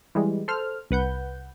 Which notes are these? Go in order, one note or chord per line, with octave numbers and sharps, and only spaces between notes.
E3 G3 G#3
A4 C5 F6
C2 B4 F#5 G6